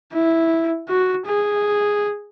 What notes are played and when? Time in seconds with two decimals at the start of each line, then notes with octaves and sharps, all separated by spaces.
0.13 E4
0.88 F#4
1.26 G#4